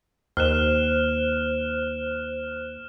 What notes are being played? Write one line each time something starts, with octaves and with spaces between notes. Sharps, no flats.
D#2 C5 F6 F#6 E7